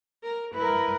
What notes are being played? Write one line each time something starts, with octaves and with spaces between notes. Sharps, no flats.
A#4
E4 A#4 B4